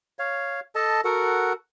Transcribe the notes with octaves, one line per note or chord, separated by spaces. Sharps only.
C#5 F5
A4 D#5 A5
F#4 A4 A#4 F#5